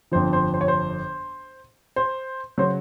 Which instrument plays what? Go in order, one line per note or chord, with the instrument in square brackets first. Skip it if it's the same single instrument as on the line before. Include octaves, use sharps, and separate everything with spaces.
[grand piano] G1 F2 D3 F3 C5
C5
C5
C#5
C5
C5
C#3 F#3 C5